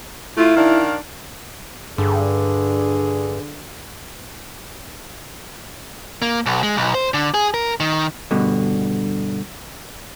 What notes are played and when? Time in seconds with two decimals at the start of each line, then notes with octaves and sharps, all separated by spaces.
0.38 A3 E4 F4
0.57 D#3 D4 F5
1.98 G2 D3 G#4
6.22 A#3
6.46 B1
6.63 G#3
6.77 B1
6.95 C5
7.14 D3
7.34 G#4
7.54 A#4
7.80 D#3
8.31 G2 B2 D3